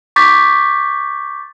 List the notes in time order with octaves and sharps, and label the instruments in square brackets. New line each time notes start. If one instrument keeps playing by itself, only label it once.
[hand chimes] C#6 D6 G6 A6 B6